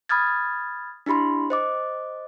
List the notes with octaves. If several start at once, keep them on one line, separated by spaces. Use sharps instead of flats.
B5 D#6 F6 G#6 A6
D4 E4 G4 B5 C6
C5 D#5 D6